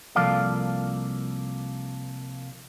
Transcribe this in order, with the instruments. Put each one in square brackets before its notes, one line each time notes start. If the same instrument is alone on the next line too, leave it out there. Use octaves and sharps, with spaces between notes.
[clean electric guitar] C2 F3 A#3 A4 D5 F5